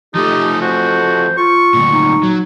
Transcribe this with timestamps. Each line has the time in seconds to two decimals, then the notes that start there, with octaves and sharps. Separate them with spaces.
0.15 F3 A3 D#4 G4
0.62 F#4 C5
1.38 F4 C#6
1.74 D2 A#2
1.91 D#4
2.23 F#3